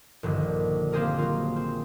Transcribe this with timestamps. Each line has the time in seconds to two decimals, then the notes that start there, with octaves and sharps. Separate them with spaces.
0.23 A#1 G2 D3 D#3
0.92 A#3 C4 G4 G#4 A#4
1.18 F#3 F4
1.55 C4 F4